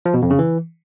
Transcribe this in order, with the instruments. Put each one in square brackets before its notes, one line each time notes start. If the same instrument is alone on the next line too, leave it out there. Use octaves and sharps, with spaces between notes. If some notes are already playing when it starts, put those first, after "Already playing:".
[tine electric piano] F3
B2
F2
C#3
E3